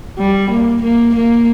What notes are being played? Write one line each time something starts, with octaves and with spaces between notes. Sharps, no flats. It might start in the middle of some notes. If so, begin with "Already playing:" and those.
G3
A#3
A#3
A#3